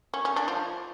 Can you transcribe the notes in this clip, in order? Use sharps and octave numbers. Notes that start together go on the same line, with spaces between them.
C#4
C#4
D4
F3